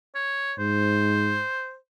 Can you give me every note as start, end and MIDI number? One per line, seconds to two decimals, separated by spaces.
0.15 0.53 73
0.59 1.42 44
0.59 1.76 72